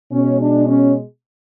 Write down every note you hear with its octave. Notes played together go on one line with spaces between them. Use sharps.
B2 G#3 C#4
D4
C#4